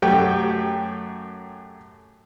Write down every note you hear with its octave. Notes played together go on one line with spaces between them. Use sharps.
F#2 A3 F#4 G4 G5